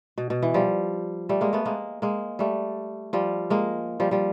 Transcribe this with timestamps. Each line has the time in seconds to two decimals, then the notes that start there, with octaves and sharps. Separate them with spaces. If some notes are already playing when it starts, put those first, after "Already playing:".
0.18 B2
0.30 B2
0.42 E3
0.54 F3 G3
1.29 G3 A3
1.41 G#3 A#3
1.53 A3 B3
1.65 G#3 A#3
2.02 G#3 A#3
2.39 G3 A3
3.13 F3 G3
3.50 G#3 A#3
4.00 F3 G3
4.11 F3 G3